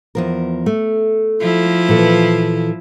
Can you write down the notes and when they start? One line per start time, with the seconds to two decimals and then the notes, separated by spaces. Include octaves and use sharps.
0.15 E2 F3 A#4
0.66 A3
1.40 F3 E4
1.89 A#2 E3 A4